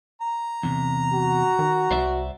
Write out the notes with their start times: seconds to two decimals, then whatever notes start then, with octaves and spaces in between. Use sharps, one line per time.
0.21 A#5
0.63 E2 C3
1.13 F#4
1.59 D#3
1.91 C2 C5 D5 E5